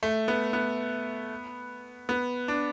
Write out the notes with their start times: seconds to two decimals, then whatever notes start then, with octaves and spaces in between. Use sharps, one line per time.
0.03 A3
0.28 B3
0.53 B3
2.09 B3
2.48 D4